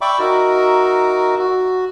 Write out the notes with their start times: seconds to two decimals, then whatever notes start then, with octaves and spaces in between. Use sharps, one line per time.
0.01 D5 E5 G5 B5 C#6 D6
0.19 D#4 F#4 A#4 E5
1.39 F#4